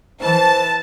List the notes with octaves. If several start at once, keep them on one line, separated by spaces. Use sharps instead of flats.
E3 C5 A5